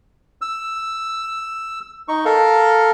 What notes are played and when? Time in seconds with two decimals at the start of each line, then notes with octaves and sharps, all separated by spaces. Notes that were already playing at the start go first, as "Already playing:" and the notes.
0.41 E6
2.08 D#4 C#6
2.25 A4 A#4 F5